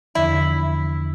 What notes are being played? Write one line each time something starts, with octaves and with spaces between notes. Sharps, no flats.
E2 D3 F3 E4